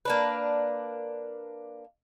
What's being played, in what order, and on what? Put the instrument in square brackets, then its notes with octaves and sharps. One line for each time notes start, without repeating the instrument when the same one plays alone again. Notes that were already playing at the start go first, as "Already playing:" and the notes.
[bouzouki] A#3 D4 B4